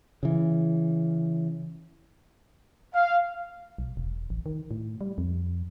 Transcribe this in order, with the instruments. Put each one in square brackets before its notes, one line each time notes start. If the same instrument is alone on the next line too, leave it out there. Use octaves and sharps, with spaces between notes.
[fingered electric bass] C#3 E3
[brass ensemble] F5
[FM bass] B1
E1
A1
D#3
A2
G3
F2